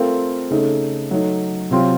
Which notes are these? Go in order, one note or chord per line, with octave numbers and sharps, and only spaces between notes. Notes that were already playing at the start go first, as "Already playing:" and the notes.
Already playing: A3 C4 F4 A#4
C#3 A3 D#4
F#3 A3 D#4
C3 F#3 C4 F4